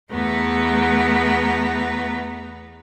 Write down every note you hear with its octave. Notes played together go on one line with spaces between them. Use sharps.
E2 A3 B3 B4 A#5